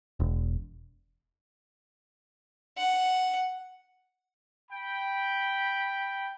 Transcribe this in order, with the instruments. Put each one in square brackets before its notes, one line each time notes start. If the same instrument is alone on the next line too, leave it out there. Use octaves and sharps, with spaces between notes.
[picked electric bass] E1
[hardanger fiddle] F#5
[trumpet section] G5 B5